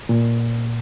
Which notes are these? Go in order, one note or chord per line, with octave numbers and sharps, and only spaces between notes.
A#2